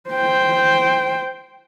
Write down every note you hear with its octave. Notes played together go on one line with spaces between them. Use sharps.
C5 G5